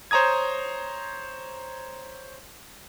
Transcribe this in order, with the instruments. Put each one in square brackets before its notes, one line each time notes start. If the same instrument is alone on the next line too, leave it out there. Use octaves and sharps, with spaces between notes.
[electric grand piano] C5 C#5 A#5 D#6 G#6